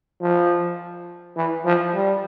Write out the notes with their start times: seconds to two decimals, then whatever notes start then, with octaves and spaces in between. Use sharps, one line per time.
0.21 F3
1.36 E3
1.65 F3
1.94 G3